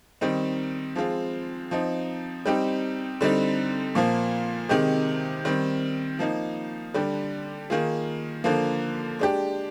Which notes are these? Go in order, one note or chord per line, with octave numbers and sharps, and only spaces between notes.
D#3 G3 C4 D#4
F3 G#3 C4 F4
F3 C4 D#4
G3 C4 D#4 G4
D3 G3 C4 D#4
A#2 F3 A#3
C3 D#3 G#3 D#4 G4
D#3 G3 C4
F3 A#3 D#4
D3 G3 D4 G4
D#3 A#3 F4 G#4
D3 F3 A#3
G#3 D4 G4